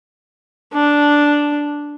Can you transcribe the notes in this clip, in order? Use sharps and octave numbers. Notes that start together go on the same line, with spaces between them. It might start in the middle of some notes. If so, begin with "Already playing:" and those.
D4